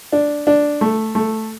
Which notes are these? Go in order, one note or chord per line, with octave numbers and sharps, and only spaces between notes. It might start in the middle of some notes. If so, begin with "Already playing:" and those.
D4
D4
A3
A3